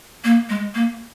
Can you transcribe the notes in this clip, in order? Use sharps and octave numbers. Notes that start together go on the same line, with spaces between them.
A#3
G#3
A#3